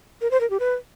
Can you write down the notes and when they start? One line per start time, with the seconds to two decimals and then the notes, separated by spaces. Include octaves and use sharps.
0.21 A#4
0.31 C5
0.41 A#4
0.50 G4
0.60 B4